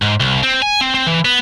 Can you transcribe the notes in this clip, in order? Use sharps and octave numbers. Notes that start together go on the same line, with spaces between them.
G#2
C2
C4
G#5
C4
C4
E3
B3